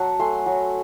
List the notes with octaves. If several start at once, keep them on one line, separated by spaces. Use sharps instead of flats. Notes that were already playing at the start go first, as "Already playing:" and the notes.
Already playing: F#3 F#5 A5
A3 G#5 C6
F#3